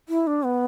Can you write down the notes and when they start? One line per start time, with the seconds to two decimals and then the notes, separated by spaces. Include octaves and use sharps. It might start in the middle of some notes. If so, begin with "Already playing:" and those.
0.09 E4
0.27 D4
0.45 B3